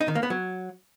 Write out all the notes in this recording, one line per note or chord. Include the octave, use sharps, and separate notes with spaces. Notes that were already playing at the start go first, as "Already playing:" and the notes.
D#4
D#3
A#3
B3
F#3